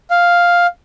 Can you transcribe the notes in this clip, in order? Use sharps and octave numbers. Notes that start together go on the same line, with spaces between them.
F5